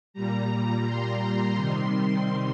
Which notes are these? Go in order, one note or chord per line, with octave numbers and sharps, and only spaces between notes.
A#2 G3 A#5
C6
C3 D#3 G3 C6